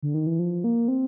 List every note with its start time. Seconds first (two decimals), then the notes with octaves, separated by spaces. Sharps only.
0.03 D3
0.14 D#3
0.27 E3
0.39 F3
0.64 A#3
0.88 C4